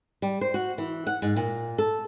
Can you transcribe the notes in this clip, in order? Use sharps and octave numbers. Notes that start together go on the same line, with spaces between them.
G3
C5
F#4
E3
F#5
G#2
A#2
A4